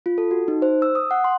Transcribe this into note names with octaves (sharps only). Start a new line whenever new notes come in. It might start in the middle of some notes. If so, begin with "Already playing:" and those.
F4
A4
F#4
D#4
C5
E6
D#6
F#5
C6